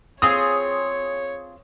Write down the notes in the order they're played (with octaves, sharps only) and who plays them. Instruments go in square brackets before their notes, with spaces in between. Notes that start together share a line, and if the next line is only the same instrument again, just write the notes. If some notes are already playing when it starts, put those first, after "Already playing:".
[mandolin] C4 F4 G#4 [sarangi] C#5 [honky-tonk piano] D#6